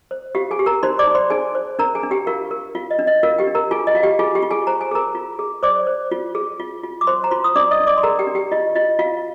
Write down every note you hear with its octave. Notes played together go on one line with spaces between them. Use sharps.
C5
F4 G4 F5
G#4 G#5
G4
A#4 A#5
D#4 C5 C6
D5 D6
D#4
C5 C6
D#4 G#4 G#5
C5
D4 A#4 A#5
G#4 G#5
D4
G4 G5
F4 A#4 F5
A#4
F4 F5
D#5
D4
D#5
F4 A#4 F5
G4 G5
D4
A#4 A#5
F4 G#4 G#5
D#5
F4 F5
G4 G5
F4 G#4 G#5
G4 G5
F4
G#4 G#5
C5 A#5
G#5
G#4 A#4 A#5
F4
G#4
C5 D5 D6
C5
F4
G#4
F4
F4
D6
C5 C6
A#5
F4 C5 C6
D#6
D4 D5 D6
D#5 D#6
D4
D5 D6
C6
G#4 A#4 A#5
G4 G5
D4
G4 G5
F4 D#5
F4 D#5
F4 F5